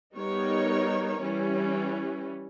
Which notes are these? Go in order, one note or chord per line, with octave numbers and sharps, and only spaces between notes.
G3 B3 D#4 A#4 C#5
E3 G3 C#4